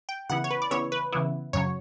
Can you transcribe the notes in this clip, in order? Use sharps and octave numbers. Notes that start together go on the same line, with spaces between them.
G5
C#3 E3 B3 E4 F#5
C#5
B4
D5
C#3 E3 B3 E4 C#5
B4
C#3 E3 B3 E4
F#2 C#3 F#3 C#5